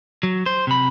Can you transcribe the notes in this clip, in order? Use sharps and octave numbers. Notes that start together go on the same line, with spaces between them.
F#3
C5
C3 B5